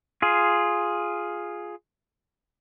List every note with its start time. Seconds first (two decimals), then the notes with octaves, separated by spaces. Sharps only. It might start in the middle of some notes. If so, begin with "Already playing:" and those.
0.22 F4 G#4